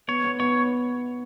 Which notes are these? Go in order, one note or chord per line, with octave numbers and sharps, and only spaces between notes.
B3 C#5
B3
B3 C#5